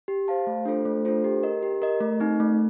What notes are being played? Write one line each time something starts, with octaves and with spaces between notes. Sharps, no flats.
G4
C5 F5 A5
A3
D4 F4 A4 C5
A3
D4 F4 A4 C5
G4
A#4 D#5
G4
A#4 D#5
A3
C4 D#4
A3